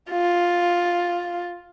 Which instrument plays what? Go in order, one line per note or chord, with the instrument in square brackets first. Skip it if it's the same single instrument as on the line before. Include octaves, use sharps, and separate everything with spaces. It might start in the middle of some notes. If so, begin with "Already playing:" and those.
[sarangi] F4